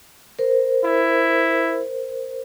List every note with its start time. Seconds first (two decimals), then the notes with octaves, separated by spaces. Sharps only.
0.39 A#4 C5
0.84 E4